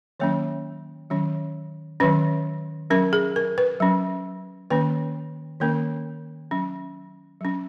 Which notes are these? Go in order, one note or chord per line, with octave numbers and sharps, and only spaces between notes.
D#3 F#3 A#3 C#4 C#5
D#3 F#3 C#4
D#3 F#3 C#4 B4
F#3 C#4 A#4
G#4
A#4
B4
F#3 C#4
D#3 A#3 C#4 B4
D#3 A#3 C#4 A#4
F#3 C#4
F#3 C#4